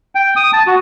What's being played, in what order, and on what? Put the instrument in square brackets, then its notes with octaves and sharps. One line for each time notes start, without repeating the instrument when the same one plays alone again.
[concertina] G5
D#6
A5
F#4